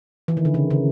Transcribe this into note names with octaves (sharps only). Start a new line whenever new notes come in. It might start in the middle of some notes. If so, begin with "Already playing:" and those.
E3
D#3
D3
C#3
C#3